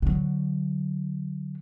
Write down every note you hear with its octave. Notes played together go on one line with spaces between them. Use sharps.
D3 F#3